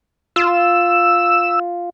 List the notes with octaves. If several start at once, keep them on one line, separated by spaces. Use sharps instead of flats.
F4 E6